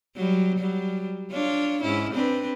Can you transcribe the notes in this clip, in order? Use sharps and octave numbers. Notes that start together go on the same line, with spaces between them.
F#3 G3
F#3 G3
D4 F4 C#5
G#2 C#4 E4
C4 D4 B4